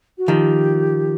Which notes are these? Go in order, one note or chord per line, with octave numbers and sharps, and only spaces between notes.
F#4
D#3 F3 G4